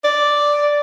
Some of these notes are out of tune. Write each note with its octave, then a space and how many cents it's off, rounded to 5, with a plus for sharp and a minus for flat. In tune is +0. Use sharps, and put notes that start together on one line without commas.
D5 +0